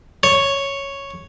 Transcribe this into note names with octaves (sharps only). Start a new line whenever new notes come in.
C#5